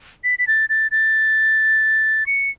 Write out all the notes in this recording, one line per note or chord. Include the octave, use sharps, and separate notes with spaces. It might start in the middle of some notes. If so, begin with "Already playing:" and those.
B6
B6
A6
A6
A6
C#7